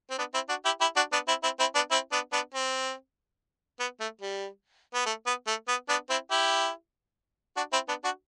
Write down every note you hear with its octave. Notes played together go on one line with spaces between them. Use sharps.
C4
B3 D4
C4 E4
D4 F#4
E4 G4
E4 G4
D4 F#4
B3 D4
C4 E4
C4 E4
C4 E4
B3 D4
C4 E4
B3 D4
B3 D4
C4
B3
A3
G3
B3
A3
B3
A3
B3
B3 D4
C4 E4
E4 G4
D4 F#4
C4 E4
B3 D4
D4 F#4